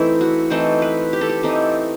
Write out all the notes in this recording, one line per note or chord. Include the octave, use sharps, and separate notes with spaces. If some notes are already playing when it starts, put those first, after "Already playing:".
Already playing: E3 A3 C4 D#4 E4
F#4
E3 A3 C4 D#4 A4
B4
G4
A4
G4
E3 A3 C4 D#4 A4